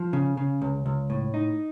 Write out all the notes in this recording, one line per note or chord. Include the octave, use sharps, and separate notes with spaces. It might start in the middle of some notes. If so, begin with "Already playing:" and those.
Already playing: F3
C#3
C#3
C#2
C#2
A2
D#4